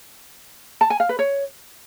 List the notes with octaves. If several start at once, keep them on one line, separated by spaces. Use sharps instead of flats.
A5
G#5
F5
B4
C#5